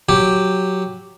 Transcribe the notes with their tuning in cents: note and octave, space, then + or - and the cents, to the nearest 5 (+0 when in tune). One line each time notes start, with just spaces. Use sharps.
F#3 +0 G4 +0